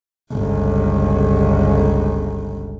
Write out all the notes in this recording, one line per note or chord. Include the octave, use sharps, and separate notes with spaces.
G1 C#2